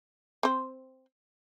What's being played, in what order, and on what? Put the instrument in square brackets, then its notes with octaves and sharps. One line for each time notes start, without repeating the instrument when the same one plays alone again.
[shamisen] C4 C5